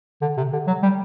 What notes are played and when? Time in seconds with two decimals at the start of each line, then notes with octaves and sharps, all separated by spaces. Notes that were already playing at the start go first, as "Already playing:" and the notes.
0.22 D3
0.37 C3
0.53 D3
0.67 F#3
0.83 G3